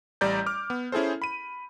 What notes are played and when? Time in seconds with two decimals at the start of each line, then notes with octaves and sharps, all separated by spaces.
0.21 A1 G3 D5 A#5 G6
0.46 D6 F6
0.70 B3
0.92 C#4 E4 G#4 A4 C5
1.22 B5 D#7